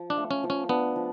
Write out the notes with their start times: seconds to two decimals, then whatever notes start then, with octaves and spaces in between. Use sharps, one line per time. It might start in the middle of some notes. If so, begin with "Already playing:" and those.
Already playing: F3
0.10 D4
0.17 A3
0.31 C#4
0.43 F3
0.50 C#4
0.69 B3 D4
0.96 F3